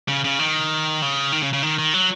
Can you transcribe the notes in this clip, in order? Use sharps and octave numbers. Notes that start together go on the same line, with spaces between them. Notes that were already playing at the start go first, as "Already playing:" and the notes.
C#3
C#3
D#3
C#3
D#3
C#3
C#3
D#3
D#3
F#3